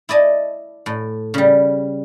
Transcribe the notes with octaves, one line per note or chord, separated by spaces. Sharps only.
E4 D5 D#5 A5
A2
C#3 G3